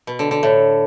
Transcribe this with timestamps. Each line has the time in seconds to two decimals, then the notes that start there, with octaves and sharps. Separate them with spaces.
0.07 B2
0.19 D3
0.31 D3
0.43 A2